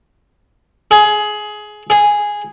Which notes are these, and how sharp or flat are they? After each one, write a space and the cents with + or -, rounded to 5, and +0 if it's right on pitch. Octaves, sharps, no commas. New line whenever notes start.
G#4 +20
G#4 -5